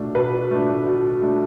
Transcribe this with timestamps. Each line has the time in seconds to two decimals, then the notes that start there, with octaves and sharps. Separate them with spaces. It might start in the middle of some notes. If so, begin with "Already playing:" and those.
Already playing: B2 A3 D4
0.15 B2 B4
0.51 A3 D4
0.87 B2
1.22 A3 D4